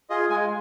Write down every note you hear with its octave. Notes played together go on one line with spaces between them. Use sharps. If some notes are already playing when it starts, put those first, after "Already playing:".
F4 G#4 D#5
G#3 G#5